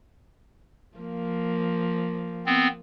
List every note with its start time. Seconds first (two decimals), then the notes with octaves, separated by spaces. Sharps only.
0.98 F3 A#3
2.46 B3 C4